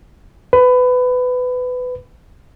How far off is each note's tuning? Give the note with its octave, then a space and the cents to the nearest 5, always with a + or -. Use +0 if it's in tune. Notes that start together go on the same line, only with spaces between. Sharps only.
B4 +20